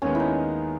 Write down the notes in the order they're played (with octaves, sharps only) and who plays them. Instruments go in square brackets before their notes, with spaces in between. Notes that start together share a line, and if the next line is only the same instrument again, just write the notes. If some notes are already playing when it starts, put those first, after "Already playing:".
[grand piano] D#2 D#3 G#3 B3 [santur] C#4
[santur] D#4 E4